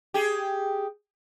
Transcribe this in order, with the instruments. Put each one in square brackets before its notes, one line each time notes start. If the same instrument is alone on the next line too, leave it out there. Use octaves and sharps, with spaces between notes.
[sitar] G4 G#4